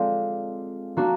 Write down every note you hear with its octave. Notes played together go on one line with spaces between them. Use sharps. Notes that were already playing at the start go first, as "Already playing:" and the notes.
Already playing: G#3 C4 F4 A4 D5
A#3 D4 F#4